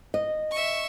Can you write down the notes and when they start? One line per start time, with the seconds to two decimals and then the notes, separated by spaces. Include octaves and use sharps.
0.14 D#5
0.52 E5 C#6